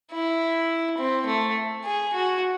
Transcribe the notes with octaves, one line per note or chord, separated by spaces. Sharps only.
E4
C4
A3
G#4
F#4